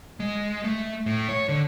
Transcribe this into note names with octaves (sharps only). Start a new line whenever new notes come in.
G#3
A3
A2
C#5
D3